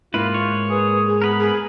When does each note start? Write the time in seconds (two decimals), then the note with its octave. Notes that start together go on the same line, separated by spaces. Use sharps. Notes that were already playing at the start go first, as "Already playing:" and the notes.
0.14 G#2 A#3 E4 F4 B4
0.34 C#5
0.70 G#4 B4
1.06 G#4
1.22 B3 A#4 B4 B5
1.39 G#4